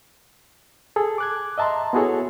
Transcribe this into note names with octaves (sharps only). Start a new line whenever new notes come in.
G#4 A4
D6 F#6 G#6
D#5 E5 A5 A#5 C6
B3 E4 F#4 G#4 A4 C#5